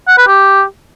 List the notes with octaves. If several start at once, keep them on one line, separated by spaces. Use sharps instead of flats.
F#5
B4
G4